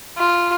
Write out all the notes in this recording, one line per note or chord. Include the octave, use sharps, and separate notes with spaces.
F4